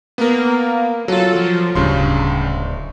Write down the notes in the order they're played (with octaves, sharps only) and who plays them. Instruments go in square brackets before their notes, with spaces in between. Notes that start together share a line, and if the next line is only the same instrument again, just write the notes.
[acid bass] A#3 [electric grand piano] B3 A#4
[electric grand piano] F#3 F4 [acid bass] A4
[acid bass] F3
[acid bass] D1 [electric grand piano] G2 C#3 C6